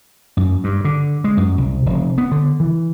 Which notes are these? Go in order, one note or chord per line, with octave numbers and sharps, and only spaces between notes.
F#2
G2
D3
G#3
F#2
C2
F1
B3
D3
E3